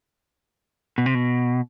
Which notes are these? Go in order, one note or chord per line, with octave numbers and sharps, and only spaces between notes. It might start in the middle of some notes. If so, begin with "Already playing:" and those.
B2
C3
B2